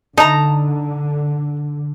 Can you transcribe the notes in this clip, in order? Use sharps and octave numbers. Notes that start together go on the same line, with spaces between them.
D3 D#4 A5 A#5